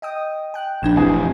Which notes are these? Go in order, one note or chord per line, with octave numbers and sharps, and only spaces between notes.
D#5 G5 D#6
G5 F#6
A#1 D4 G#6 E7
F1 C3 E3 G#4